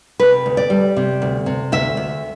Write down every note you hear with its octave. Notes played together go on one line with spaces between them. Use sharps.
C3 B4
D2
D5
G3
C3
D2
C3
D2 E5
D2